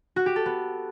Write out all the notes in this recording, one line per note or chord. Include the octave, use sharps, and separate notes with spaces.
F#4
G4
A4
B3